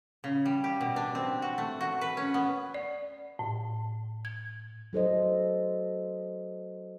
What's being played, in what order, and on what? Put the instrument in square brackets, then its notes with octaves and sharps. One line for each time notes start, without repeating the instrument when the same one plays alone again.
[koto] C#3
G3
G4
B2
D4
C4
F#4
A3
F#4
B4
C#4
B3
[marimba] D5
A2
G#6
[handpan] F#3 A4 C5 D#5